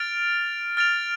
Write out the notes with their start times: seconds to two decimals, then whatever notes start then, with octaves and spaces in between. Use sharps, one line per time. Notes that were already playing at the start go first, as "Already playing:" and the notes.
Already playing: F6 A6 D7 F7
0.77 F6 A6 D7 F7